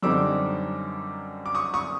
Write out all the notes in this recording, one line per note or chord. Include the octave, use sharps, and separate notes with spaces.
F#2 D3 G3 C4 D#4 D6 E6
D6
C#6 D#6
C#6 D#6